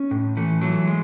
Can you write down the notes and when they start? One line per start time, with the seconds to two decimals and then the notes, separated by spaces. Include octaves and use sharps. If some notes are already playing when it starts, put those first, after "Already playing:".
Already playing: C#4
0.11 A2
0.37 E3 A3
0.62 E3 F#3
0.87 G#3